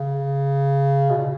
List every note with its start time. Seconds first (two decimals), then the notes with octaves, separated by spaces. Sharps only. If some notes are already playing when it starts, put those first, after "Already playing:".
Already playing: C#3
1.10 B2
1.18 A#2